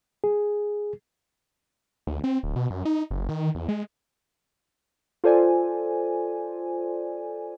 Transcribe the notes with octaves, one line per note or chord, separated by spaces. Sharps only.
G#4
D2
C4
D1
B2
F#2
D#4
F#1
D#3
E2
G#3
F4 A4 C5 D5 G#5